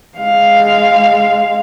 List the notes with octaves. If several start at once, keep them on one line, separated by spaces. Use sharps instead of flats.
G#3 F5